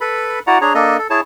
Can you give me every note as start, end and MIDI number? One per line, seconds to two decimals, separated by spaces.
0.01 0.39 69
0.01 0.39 71
0.01 0.39 83
0.47 0.58 64
0.47 0.58 66
0.47 0.58 74
0.47 0.58 78
0.47 0.58 82
0.61 0.73 62
0.61 0.73 68
0.61 0.73 73
0.61 0.73 82
0.75 0.97 58
0.75 0.97 62
0.75 0.97 69
0.75 0.97 75
0.99 1.07 69
1.10 1.21 64
1.10 1.21 68
1.10 1.21 73
1.10 1.21 81